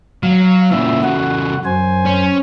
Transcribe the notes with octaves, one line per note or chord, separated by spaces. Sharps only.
F#3 F5
A#2 C#3 E3 E5
F#4 F#5
F#2 C5 G#5
C#4